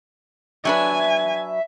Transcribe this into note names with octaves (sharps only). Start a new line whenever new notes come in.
F#3 D4 B4 E5 G#5